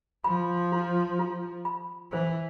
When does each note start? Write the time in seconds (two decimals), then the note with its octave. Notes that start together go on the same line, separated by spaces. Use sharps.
0.24 F3 B5
0.72 F4
1.19 F4
1.65 B5
2.12 E3 C5